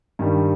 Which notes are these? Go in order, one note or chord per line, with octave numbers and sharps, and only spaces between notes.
G2 D#3 G3